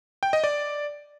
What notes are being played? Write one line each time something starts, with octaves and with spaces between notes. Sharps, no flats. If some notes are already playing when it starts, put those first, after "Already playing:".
G5
D#5
D5